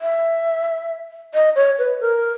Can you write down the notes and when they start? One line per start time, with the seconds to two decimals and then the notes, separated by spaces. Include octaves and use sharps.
0.01 E5
1.34 D#5
1.55 C#5
1.78 B4
2.00 A#4